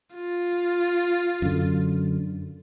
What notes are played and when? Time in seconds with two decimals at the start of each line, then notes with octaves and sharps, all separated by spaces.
0.15 F4
1.42 F#2 D3